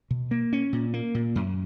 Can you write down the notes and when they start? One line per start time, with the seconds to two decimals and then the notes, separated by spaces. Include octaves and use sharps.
0.11 B2
0.31 A#3
0.53 C#4
0.73 A#2
0.94 A#3
1.15 A#2
1.36 F#2